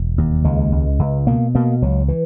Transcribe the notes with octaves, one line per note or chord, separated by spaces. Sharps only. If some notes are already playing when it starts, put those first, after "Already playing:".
Already playing: E1
D#2
C#2 G#3
C#2
C#2
B2 A#3
B2 A#3
C#2 F#3
E3